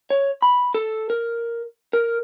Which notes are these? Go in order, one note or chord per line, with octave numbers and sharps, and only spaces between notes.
C#5
B5
A4
A#4
A#4